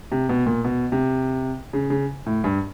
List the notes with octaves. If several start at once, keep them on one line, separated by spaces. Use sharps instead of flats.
C3
B2
A#2
B2
C3
C#3
C#3
A2
G2